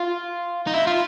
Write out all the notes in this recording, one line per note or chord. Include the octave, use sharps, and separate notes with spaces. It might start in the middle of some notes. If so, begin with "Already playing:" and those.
Already playing: F4
D#4
E4
F4